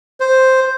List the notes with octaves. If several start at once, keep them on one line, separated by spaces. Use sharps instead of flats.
C5